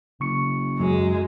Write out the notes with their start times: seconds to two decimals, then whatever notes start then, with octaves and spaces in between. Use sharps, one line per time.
0.20 F#1 C#3 C#6 C#7
0.79 F#2 F#3 G#3